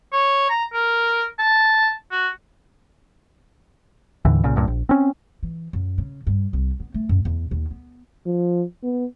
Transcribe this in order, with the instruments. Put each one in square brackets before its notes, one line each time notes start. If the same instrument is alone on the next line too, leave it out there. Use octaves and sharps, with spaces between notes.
[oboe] C#5
A#5
A#4
A5
F#4
[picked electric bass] D#2 A2 D3 E3
C2 A#2 C#3
C#2 G2 A#2
A#1
C4 C#4
[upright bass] E3
F#2
C#3
G2
C2
B3
A3
F#2
E2
D#2
B3
[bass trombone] F3
B3